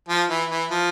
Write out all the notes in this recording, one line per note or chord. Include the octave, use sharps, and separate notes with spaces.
F3
E3
E3
F3